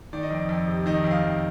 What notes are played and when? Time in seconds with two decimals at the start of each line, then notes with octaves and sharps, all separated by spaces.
0.13 D#3 D5
0.23 D#5
0.31 F2 D5
0.49 F2
0.67 C3
0.86 D#3 D#5
1.04 F2 D#5
1.11 F5
1.23 F2